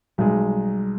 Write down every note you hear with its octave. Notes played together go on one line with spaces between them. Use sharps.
B1 G3 G#3